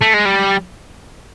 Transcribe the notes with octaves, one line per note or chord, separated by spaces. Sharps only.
A3
G#3
G3